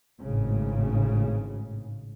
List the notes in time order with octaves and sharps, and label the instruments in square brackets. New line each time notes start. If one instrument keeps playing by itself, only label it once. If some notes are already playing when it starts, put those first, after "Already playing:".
[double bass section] G#1 A2 C#3